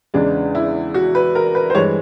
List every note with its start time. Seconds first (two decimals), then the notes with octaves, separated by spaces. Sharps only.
0.14 E2 C#3 E3 G#3 D4
0.55 E4
0.94 F#4
1.15 B4
1.35 A#4
1.55 B4
1.70 C5
1.75 G2 E3 G#3 C#5